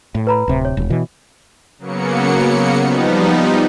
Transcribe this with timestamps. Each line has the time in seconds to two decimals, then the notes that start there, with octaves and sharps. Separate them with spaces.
0.15 A2
0.27 B4 A#5 B5
0.48 D1 C3
0.65 C#5
0.77 E1
0.90 B2 E3
1.79 C#3 F#3 A#3 B3 C#7
2.80 F3 G3 B3 D#4